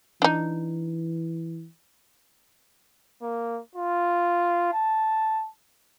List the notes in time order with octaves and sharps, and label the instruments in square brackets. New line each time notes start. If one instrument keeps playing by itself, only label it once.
[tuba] E3 [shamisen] D4 D#4
[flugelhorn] A#3
F4
A5